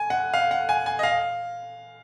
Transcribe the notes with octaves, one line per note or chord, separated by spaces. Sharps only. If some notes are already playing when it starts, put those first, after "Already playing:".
Already playing: G#5
F#5
F5
F#5
G#5
G#5
D#5
F5